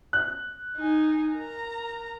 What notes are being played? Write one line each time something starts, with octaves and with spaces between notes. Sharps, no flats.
F#6
D#4 G#5
A#4 A#5